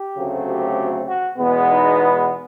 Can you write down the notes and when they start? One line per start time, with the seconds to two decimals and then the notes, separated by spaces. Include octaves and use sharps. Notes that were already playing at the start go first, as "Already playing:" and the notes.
Already playing: G4
0.17 D2 C#3 F#3 A3 C4
0.47 G4
1.07 F#4
1.37 E2 B2 G#3 B3
1.68 D#4